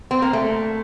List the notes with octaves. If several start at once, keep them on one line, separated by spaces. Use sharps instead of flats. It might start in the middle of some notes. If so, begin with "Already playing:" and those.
C4
A#3
A3